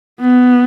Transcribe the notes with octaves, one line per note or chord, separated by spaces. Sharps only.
B3